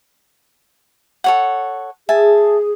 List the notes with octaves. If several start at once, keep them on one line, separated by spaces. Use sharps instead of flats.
A4 C#5 F#5
G#4 E5 G#5 A5